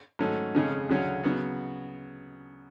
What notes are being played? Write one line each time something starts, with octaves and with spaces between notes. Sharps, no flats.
G#2 F#3 A3 C#4
F2 C#3 G#3 C#4
D2 C#3 F#3 C#4 F#4
C#3 F#3 B3 F#4